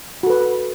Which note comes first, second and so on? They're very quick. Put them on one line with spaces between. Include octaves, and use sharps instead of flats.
F#4 A4 B4